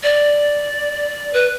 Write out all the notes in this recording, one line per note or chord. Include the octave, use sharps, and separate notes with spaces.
D5
B4